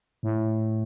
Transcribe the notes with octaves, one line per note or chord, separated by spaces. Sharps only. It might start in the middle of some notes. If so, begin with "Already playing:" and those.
A2